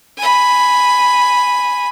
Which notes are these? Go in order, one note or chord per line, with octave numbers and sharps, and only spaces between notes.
G#5 B5